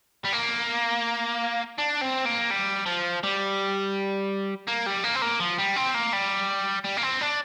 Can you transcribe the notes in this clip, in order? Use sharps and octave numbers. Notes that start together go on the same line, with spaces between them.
G3
A#3
D4
C4
A#3
G3
F3
G3
A#3
G3
A#3
C4
A#3
F3
G3
C4
A#3
G3
G3
A#3
C4
D4